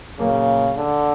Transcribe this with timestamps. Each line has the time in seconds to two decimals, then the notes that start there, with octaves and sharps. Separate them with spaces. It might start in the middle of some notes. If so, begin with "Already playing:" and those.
0.19 A#2 C#3 F#3 A#3
0.77 D3